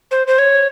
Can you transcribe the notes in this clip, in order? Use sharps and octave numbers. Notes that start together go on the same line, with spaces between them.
C5
C5
C#5